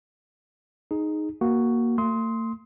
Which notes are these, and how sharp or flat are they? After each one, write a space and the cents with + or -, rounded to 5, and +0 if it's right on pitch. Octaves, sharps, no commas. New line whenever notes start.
D#4 -5 G#4 +10
A#3 +10 F#4 +5
A3 +45 C6 +0 D#6 +35